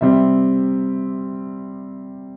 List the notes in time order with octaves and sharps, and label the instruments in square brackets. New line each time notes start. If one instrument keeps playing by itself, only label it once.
[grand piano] C3 G3 C4 E5